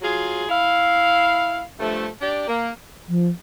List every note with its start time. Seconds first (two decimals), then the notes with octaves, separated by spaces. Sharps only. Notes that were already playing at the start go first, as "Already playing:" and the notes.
0.02 F#3 F4 G#4
0.49 E4 F5
1.79 G2 F3 A3
2.21 D4 G4 D5
2.48 A#3
3.09 F3